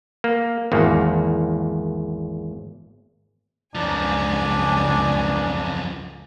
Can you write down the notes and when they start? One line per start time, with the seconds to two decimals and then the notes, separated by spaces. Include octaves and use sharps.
0.24 A#3
0.72 G#1 E2 A#3
3.75 C#2 F#2 F3 D4 G#5